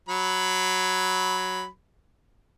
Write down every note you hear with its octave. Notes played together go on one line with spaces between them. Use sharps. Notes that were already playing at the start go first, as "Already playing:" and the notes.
F#3 B5